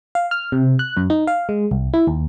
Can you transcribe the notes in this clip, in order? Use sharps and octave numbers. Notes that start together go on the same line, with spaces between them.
F5
F6
C3
F#6
F#2
D#4
F5
G#3
C2
E4
D#2